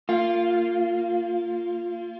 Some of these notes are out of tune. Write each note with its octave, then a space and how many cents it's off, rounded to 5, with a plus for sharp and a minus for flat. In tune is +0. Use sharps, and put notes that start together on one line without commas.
A#3 -30 F4 +0